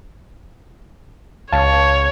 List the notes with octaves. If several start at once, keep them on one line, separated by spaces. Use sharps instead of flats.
C#2 C#5 F5 A5